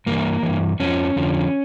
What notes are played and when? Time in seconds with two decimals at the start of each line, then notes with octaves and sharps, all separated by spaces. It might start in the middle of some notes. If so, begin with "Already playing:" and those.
0.06 G2 E3 A#3
0.43 E3
0.48 G2
0.80 F2 D3 F3 C#4
1.16 F2 D3 F3